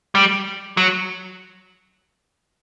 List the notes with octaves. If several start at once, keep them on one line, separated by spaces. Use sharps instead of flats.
G3
F#3